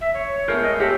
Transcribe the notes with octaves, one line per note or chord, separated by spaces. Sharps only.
E5
C#5
G#3 A3 B3 A#4 G6 C7
D#5
G4 A4 C#5 E5 F#5 A5